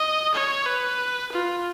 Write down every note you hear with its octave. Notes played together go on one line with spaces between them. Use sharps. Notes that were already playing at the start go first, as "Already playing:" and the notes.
Already playing: D#5
C#5
B4
F4